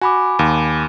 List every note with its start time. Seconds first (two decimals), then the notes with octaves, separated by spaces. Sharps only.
0.01 F#4 G#5 B5 D6
0.39 D#2